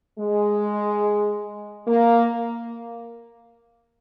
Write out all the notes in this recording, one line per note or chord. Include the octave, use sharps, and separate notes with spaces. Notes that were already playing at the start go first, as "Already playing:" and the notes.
G#3
A#3